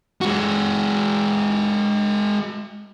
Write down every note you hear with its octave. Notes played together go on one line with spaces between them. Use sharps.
G#3 F#4